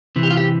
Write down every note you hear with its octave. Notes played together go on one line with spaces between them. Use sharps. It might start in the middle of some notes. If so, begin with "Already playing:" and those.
C3 E3
G4
F4
G4